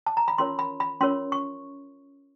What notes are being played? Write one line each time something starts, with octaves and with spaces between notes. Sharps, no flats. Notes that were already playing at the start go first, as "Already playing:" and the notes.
A5
A#5
B5
C#4 F4 A#4 C#5 C6
B5
B5
C#4 F4 A#4 C#5 C6
C#6